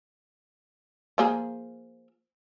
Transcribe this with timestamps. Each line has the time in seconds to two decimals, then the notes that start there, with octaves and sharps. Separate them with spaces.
1.18 F3 A#3 G#4